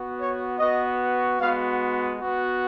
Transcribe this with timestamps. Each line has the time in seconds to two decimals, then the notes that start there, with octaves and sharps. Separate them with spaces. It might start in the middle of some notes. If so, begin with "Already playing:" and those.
Already playing: B3 F#4
0.19 C#5
0.59 B3 F#4 D#5
1.40 G#3 B3 F#4 F5
2.21 B3 F#4